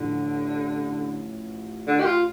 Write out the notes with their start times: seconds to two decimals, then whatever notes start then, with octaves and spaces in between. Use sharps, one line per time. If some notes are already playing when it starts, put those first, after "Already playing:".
Already playing: A1 A2 D3 F3
1.87 D3
2.01 G4
2.06 F4